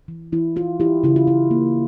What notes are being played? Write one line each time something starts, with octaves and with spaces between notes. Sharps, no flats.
E3
E3 E4
E4 F4
E3 E4 G4
C#3 E4
F4
C#3 E4
A#3